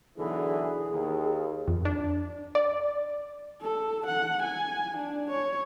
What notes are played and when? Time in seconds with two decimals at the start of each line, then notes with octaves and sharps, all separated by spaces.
0.17 B1 D3 E3 G#4
0.90 D#2
1.68 F2
1.85 D4
2.55 D5
3.61 A4
4.07 F#5
4.42 G#5
4.97 D4
5.30 C#5